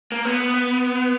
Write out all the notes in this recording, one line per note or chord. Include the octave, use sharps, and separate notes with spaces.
A#3
B3